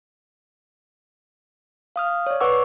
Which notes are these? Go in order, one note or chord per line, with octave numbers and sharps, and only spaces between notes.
F5 D#6 F6
C#5 D5
B4 F#5 C#6 D6 E6